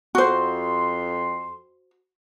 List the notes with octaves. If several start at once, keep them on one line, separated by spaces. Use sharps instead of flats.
F2 F#4 C5 C6